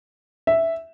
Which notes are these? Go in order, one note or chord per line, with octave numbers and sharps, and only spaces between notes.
E5